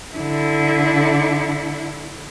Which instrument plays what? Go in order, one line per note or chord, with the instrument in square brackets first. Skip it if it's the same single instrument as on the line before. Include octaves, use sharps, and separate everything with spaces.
[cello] D3 E4